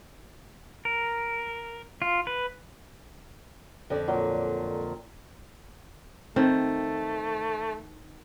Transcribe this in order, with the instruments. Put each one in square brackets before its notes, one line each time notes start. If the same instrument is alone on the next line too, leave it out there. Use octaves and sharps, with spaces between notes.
[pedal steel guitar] A#4
F4
B4
[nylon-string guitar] F2 D3 D5
[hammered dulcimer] A#2 F#3
[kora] D#3 [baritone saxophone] A3 [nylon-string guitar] C4